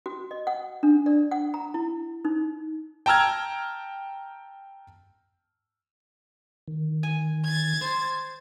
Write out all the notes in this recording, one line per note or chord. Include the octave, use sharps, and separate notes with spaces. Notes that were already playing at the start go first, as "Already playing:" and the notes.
F#4
D#5
F#5
D4
D5
F#5
A#5
E4
D#4
G5 A5 A#5 E6 F6 G#6
D#3
G#5
G#6 A6
C5